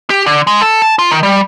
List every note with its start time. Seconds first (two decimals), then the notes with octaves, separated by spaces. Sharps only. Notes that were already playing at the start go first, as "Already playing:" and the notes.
0.10 G4
0.26 D3
0.47 G#3
0.62 A4
0.82 A5
0.99 F4
1.11 D#3
1.23 G3